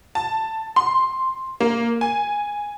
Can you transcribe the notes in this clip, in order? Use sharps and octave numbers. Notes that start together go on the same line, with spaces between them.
A5
C6
A#3
G#5